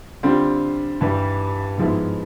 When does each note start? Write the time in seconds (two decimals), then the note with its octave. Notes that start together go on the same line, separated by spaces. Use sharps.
0.23 D3 G3 C4 F4
1.01 G2 E3 G3
1.77 G#2 F3 G#3 B3 E4